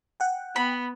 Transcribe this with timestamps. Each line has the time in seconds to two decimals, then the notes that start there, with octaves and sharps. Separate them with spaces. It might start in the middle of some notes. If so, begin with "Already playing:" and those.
0.20 F#5 G5
0.56 B3 B5